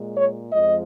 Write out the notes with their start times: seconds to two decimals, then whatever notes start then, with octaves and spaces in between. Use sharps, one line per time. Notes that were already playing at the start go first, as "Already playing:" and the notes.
Already playing: A#2 G#3
0.14 C#5
0.51 F2 F3 G#3 D#5